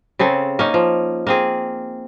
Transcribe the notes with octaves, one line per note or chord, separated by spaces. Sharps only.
C#3 C4 G#4 A4
A#3 C#4 D#4
F3
A#3 C4 G#4